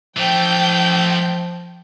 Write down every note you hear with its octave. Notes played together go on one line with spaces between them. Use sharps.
E3 F3 A3 G5 G6